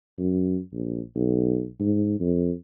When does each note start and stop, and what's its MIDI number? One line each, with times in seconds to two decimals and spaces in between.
0.18 0.59 42
0.73 1.00 34
1.15 1.67 35
1.80 2.16 44
2.20 2.52 41